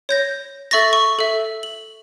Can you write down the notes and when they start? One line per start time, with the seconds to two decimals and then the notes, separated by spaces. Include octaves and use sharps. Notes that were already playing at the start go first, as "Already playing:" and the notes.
0.09 C#5 G6 A#6
0.71 A4 E5 C#6 A6 A#6
0.93 C#6
1.19 A4 E5
1.63 F#7